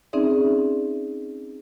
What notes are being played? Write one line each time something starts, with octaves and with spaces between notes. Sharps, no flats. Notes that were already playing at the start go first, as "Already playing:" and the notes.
C4 C#4 D#4 G#4 D5 E5